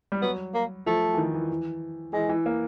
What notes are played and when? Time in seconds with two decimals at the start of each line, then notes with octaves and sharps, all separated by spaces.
0.12 G3
0.22 F#3 B3
0.54 A#3
0.87 F3 A3
1.14 E3
1.18 D#3
1.34 E3
1.49 E3
2.13 E3 G#3
2.29 E3
2.46 A#3